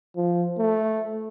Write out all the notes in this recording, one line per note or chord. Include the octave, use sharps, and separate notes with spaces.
F3
A3